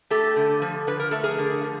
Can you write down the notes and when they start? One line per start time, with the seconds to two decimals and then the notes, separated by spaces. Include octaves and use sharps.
0.10 A3 G4 A4
0.36 D3
0.62 F3
0.87 D3 B4
1.00 A#4
1.11 A3 A4
1.24 G#4 A#4
1.38 D3
1.64 F3